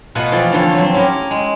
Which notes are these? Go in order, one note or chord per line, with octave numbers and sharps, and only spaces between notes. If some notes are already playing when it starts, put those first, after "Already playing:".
B2 A3 F4 F#5 G#5 B5
E3 F3 G4 A4 D5
D3 E3 F3 C4 A4 C#5
F#3 C4
C#4 E4 G4 A#4
G#3